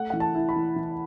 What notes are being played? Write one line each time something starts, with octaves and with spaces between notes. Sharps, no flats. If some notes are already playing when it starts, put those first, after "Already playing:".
Already playing: A3 F#5
E3 F#5
A5
E4
B5
E3
E3